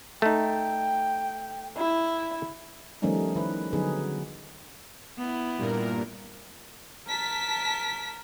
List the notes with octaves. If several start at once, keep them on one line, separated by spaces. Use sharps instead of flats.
A3 D#4 G5
E4
D#3 F3 G3 A3 C#4 D#4
D#3 E4 B4
D3 F#3 B3 D#4 G#4 B4
B3 E4
G2 A#2 A#4
A#4 A5 B6